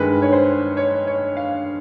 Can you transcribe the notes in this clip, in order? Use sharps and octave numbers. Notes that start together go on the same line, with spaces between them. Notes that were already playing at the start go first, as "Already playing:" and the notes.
Already playing: G2 D#3 G#3 B4
C#5
C5
C#5
C#5
F5